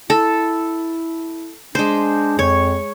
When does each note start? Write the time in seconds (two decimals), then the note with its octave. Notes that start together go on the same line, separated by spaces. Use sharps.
0.10 E4 A4
1.75 G#3 D4 C5
2.39 F2 C#5